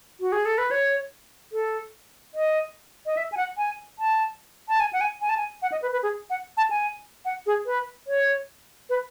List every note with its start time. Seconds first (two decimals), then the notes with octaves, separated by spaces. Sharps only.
0.20 F#4
0.32 G#4
0.45 A4
0.58 B4
0.71 C#5
1.52 A4
2.34 D#5
3.06 D#5
3.17 E5
3.32 G#5
3.37 F#5
3.57 G#5
3.99 A5
4.68 A5
4.80 G#5
4.93 F#5
5.01 G#5
5.21 G#5
5.29 A5
5.37 G#5
5.62 F#5
5.72 D#5
5.82 B4
5.92 B4
6.03 G#4
6.30 F#5
6.57 A5
6.70 G#5
7.25 F#5
7.46 G#4
7.66 B4
8.07 C#5
8.90 B4